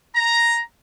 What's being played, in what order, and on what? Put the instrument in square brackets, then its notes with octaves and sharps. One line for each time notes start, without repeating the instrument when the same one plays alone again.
[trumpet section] A#5